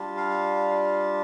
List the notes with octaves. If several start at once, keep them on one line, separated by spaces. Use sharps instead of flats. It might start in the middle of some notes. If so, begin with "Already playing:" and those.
Already playing: G3 D4 F4
F5